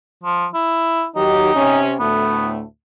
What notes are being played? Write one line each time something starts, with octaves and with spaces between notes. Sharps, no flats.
F3
E4
D#3 F#3 D#4 G4
C3 C#4
D2 A2 A3 B3